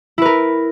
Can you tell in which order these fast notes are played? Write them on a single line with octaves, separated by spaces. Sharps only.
E4 B4 A#4